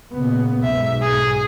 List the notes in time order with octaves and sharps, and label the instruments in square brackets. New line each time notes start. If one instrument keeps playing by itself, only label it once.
[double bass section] A#2 C#3 B3
[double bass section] B1 G#2 [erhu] E5
[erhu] G#4